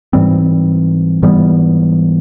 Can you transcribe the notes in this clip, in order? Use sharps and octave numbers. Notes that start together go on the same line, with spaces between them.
G#2 E3 G3 C4
G#2 E3 G3 B3